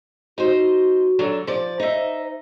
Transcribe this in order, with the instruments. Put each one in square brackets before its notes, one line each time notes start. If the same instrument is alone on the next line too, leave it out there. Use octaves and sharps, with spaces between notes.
[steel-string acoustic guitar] D#4 C5 [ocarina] F#4
[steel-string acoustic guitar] D3 F#3 D4
[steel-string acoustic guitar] F3 D5 [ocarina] C5
[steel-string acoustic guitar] D#4 E5